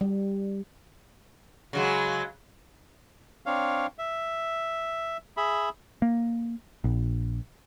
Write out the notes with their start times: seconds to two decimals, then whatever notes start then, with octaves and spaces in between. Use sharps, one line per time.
0.01 G3
1.73 C#3 F#3 G#3
3.46 C4 D4 C#5 F5
3.99 E5
5.37 G#4 E5 B5
6.02 A#3
6.84 A#1